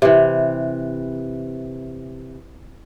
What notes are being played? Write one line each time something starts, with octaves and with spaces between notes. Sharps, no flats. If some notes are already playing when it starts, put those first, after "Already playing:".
C3 E3